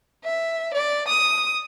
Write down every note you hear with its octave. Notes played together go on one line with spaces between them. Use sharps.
E5
D5
D#6